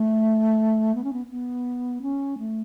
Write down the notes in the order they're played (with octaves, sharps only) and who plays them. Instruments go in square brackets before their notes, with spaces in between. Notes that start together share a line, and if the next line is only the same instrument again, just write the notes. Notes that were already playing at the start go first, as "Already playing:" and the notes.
Already playing: [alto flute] A3
B3
C#4
B3
B3
C#4
A3